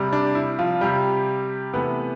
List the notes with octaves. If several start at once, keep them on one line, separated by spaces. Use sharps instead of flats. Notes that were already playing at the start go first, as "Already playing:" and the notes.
Already playing: C3 G3
D4
E4
F3 F4
C3 G3 G4
C3 E3 A3 B3 B4